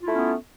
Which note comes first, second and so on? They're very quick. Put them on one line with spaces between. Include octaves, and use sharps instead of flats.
F4 E4 A3 C#4 B3